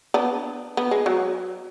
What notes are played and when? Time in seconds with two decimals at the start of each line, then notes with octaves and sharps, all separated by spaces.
0.14 B3 D4
0.77 B3
0.91 G#3
1.06 F#3